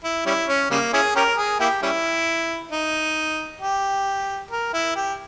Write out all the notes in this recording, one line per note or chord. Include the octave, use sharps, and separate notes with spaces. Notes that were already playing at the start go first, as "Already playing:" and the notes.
E4
G3 C#4 E4
C#4
C#3 G3 A#3
C#4 E4 G#4
C#4 G4 A#4
G#4
A#3 E4 G4
G3 C#4 E4
D#4
G4
A#4
E4
G4